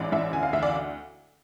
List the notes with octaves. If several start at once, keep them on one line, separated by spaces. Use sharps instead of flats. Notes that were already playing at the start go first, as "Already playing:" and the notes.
Already playing: A1 G#2 D5
A1 E5
D2 G#5
F5
D2 E5
D5